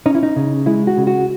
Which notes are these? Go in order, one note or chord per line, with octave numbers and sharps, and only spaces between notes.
C#4 D#4
E4
D#4
C#3
G#3 E4
F#4
C#3
F#4